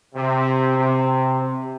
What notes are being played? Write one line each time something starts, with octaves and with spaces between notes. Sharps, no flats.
C3
C3
C3